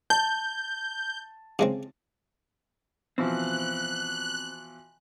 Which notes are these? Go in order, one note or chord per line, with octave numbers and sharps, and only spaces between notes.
A5 G6
C#3 G#3 C4
B2 E3 F3 C4 F#6